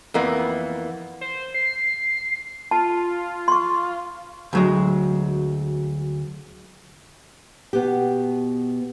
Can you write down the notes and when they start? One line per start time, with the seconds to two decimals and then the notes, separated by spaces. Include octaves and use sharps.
0.14 F2 E3 A#3 B3
1.21 C5
1.54 C7
2.71 F4 A5
3.48 C6 C#6
4.53 D2 F#3 G#3
7.73 B2 B3 G4